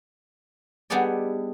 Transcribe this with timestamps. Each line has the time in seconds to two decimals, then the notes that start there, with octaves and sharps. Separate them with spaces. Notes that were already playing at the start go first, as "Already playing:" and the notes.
0.90 G3 B3 D4 D#4 G#4 D5